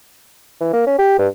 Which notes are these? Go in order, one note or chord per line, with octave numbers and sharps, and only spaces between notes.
E3
A#3
C#4
G4
G2